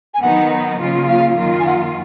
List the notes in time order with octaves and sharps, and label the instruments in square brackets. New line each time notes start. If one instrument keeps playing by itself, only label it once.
[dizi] G#5
[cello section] D#3 F#3 B3 D#4 [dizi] F#5
[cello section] C#3 F#3 A#3 F4
[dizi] F5
[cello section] F#2 D#3 A#3 F4
[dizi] G#5
F#5